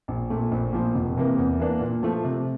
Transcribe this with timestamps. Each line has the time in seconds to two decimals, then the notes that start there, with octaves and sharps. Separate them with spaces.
0.08 A#1
0.30 A#2 A3
0.51 A#1
0.73 A#2 F3
0.95 F1
1.17 F2 C3 E3 A#3
1.38 E2
1.60 E3 A#3 D4
1.81 A#2
2.03 F3 A3
2.25 C3